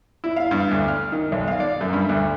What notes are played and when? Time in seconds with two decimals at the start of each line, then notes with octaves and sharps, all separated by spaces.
0.24 E4
0.36 F5
0.51 G2
0.71 D2
0.88 F6
1.12 D#3
1.32 B1
1.48 F5
1.60 D5
1.81 F#2
1.93 G2
2.09 D2